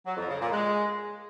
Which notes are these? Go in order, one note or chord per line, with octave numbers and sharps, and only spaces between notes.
F#3
F2
C#3
A#2
G#3